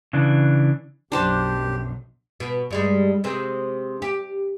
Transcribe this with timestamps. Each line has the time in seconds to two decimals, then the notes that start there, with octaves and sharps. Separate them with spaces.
0.13 C#3 E3 D4
1.12 B1 F#2 D4 G4 C5 A5
2.40 B2
2.71 G2 G3 G#3
3.24 C3 G#3 C4
4.02 G4